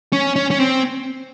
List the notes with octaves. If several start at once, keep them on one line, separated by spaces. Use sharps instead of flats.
C#4
C#4
C#4
C4